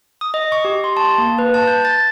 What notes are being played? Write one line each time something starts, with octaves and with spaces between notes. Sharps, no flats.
D#6
D#5
C#6
G4
C6
A5
A#3
B4
A5
G6
A6